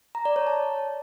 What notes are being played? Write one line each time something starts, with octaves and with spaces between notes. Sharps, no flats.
A#5
D5
C#5
A5